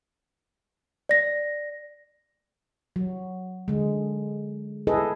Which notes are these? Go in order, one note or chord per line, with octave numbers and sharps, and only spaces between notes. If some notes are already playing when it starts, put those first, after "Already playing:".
D5 A#6
F#3
D3 G#3
E4 G#4 A4 B4 D#5